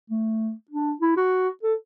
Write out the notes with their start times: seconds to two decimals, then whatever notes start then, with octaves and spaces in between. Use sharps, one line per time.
0.10 A3
0.71 D4
1.01 E4
1.17 F#4
1.63 A4